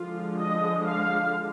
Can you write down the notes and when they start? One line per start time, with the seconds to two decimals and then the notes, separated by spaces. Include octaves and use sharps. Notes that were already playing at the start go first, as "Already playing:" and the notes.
Already playing: D3 F3 G#3 F4
0.40 D#5
0.87 F5